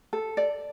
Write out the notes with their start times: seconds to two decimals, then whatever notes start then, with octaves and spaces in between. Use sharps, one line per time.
0.13 A4
0.37 D5